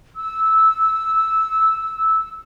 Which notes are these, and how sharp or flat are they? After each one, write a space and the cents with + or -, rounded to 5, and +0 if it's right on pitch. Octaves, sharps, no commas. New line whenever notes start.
E6 -15